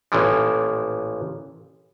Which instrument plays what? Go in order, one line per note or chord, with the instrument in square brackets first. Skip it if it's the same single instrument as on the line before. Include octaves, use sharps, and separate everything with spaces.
[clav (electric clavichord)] A1 A#2 E3 F3